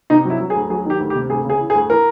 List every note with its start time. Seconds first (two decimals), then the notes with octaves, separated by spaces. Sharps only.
0.10 C3 D#4
0.25 F#3 E4
0.40 F#3
0.50 G#4
0.55 D2
0.70 F#3 G#4
0.85 D#3 G4
1.00 D2
1.10 G4
1.15 C3
1.30 D2 G#4
1.45 C#3 G#4
1.60 E3
1.70 G#4
1.75 D2
1.90 E3 A#4